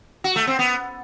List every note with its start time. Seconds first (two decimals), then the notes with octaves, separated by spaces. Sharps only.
0.24 F#4
0.36 A3
0.47 C4
0.59 B3